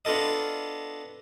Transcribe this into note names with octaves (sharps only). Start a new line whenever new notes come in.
B3 D4 F4 A4 D#5